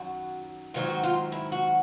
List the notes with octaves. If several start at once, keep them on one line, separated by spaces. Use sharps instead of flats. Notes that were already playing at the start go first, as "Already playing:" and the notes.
Already playing: F#2 D#3 F#3 F#4
G#2 D#3 F#3 F4
F#4
F4
E4
F#4